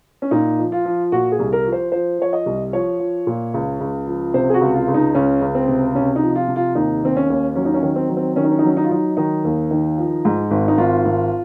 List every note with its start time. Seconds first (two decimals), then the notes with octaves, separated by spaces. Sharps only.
0.22 C#4
0.31 A#2 D#4
0.59 F3
0.72 F4
0.85 F3
1.12 A#2 F#4
1.32 G#4
1.39 C2
1.53 A#4
1.66 F3
1.72 C5
1.92 F3 C5
2.19 F3 C#5
2.33 D#5
2.46 C2
2.73 F3 C#5
2.99 F3
3.27 A#2
3.54 C#2
3.80 C#2
4.07 F3
4.34 C3 C5
4.50 G#4
4.54 F#4
4.61 C#2
4.74 F4
4.88 C#2
4.94 D#4
5.14 C#2 C#4
5.41 C#2
5.55 C4
5.68 C3
5.95 C3 C#4
6.16 D#4
6.22 F3
6.35 F4
6.48 C3
6.56 F4
6.75 D#2 D#4
7.03 D#3 C4
7.16 C#4
7.30 D#2
7.55 F#3 C#4
7.65 D#4
7.74 C#4
7.83 D#3
7.96 C4
8.09 F#3
8.17 C4
8.36 D#3 C#4
8.44 D#4
8.51 C#4
8.59 D#4
8.63 F#3 C#4
8.77 D#4
8.84 F4
8.90 F#3 D#4
9.17 D#3 D#4
9.44 D#2
9.71 D#3
9.98 F3
10.25 G#2
10.51 G#1
10.68 D#4
10.78 G#1 F4
11.05 G#1